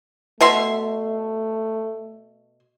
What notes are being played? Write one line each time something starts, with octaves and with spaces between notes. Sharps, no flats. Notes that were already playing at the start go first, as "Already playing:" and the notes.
B2 A3 E5 C6